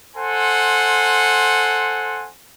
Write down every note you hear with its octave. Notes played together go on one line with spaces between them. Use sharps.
A4 C5 F#5 G#5 C6